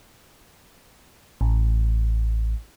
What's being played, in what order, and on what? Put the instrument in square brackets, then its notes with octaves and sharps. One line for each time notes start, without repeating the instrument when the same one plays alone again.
[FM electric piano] A1